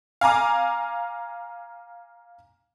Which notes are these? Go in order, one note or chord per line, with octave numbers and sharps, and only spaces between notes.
F5 G#5 A#5 D6